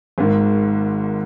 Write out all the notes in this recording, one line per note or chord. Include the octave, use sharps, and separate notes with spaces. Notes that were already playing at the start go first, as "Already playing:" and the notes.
G#1 G#2 D#3